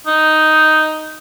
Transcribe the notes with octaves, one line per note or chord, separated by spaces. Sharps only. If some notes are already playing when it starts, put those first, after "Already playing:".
D#4